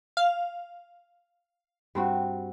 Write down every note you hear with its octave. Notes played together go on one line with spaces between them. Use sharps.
F5
G2 C4 F#4